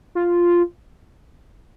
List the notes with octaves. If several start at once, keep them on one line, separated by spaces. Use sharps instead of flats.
F4